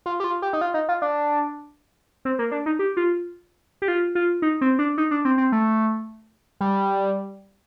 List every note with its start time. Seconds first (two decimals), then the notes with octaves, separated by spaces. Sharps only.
0.06 F4
0.20 G4
0.24 F4
0.42 G4
0.53 D#4
0.61 F4
0.74 D#4
0.89 F4
1.02 D4
2.25 C4
2.39 A#3
2.52 D4
2.66 D#4
2.79 G4
2.97 F4
3.82 G4
3.88 F4
4.15 F4
4.42 D#4
4.61 C4
4.79 D4
4.98 D#4
5.11 D4
5.25 C4
5.38 C4
5.52 A3
6.61 G3